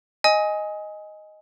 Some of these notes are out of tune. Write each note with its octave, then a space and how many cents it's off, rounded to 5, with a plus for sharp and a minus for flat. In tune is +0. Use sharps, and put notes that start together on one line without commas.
D#5 +0 G#5 +0 D#6 +30